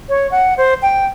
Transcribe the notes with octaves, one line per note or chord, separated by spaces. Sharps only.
C#5
F#5
C5
G5